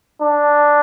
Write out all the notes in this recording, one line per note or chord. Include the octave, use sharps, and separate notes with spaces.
D4